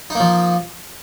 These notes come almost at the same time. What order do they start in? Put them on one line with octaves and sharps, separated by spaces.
D#4 A#3 F3